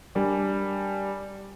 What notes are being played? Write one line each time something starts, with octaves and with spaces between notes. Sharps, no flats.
G3 D4 A#4 G#5 D6